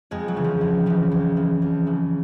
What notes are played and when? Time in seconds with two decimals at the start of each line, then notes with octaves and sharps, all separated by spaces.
0.11 F2 G#3
0.28 F#3
0.36 C#3 E3
0.44 F3
0.61 F2
0.86 C#3 E3 F3
1.11 F2
1.37 C#3 E3
1.62 F2
1.86 C#3 E3